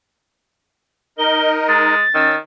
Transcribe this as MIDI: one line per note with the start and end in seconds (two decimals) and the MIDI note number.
1.18 1.95 63
1.18 1.95 70
1.18 1.95 75
1.18 1.49 103
1.69 2.02 56
1.69 2.36 93
2.15 2.38 51
2.15 2.36 61
2.15 2.36 88